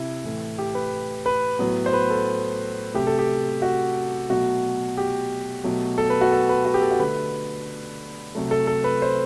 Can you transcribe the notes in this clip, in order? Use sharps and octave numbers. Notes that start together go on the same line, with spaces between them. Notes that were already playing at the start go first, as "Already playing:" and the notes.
Already playing: C3 E4
A2 E3 A3
G4
B4
B4
A2 F#3 B3
C5
B4
A4
C3 F#3 A3 G4
A4
G4
F#4
B2 F#3 A3 F#4
G4
B2 F#3 A3
A4
B4
F#4
A4
B4
F#4
G4
A4
F#4
D3 A3 B4
C3 F#3 A3
A4
A4
B4
C5